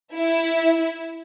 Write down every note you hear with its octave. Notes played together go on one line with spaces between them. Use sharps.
E4 E5